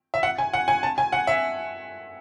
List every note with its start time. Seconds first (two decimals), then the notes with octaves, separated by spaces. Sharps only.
0.14 E5
0.23 F#5
0.38 G#5
0.53 F#5
0.68 G#5
0.83 A5
0.98 G#5
1.12 F#5
1.27 E5